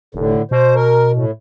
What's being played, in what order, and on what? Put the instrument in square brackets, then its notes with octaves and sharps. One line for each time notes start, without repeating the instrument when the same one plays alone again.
[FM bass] F1 [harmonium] A2 D3
[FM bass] B2 [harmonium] C5
[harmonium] A#4
A2